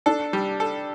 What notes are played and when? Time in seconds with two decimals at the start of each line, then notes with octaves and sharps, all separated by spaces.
0.06 D4 A4
0.33 G3
0.60 A4